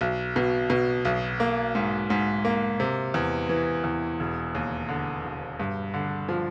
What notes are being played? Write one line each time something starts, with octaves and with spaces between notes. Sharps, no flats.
B1
B2
B2
B1
A#3
G#2
G#2
A#3
C3
E2
E3
E2
E1
D#2
D3
E1
G2
D3
F3